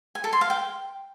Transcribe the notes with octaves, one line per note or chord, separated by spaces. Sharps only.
G#5
A4
C6
F5
G5